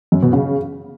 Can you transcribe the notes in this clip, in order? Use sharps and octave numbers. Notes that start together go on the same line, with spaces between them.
F#2
B2
C#3